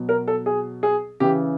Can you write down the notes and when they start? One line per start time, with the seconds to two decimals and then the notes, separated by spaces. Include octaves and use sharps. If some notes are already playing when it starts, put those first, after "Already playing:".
Already playing: B2 F#3
0.09 A#4
0.28 A4
0.46 G#4
0.83 G#4
1.20 C#3 E3 G4